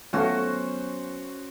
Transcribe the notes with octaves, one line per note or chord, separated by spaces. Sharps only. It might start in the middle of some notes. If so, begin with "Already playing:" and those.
F#3 A3 B3 C#4 F4 F#4 C5